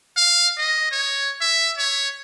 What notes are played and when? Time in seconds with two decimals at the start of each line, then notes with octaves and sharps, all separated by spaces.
0.17 F5
0.58 D#5
0.91 C#5
1.41 E5
1.78 C#5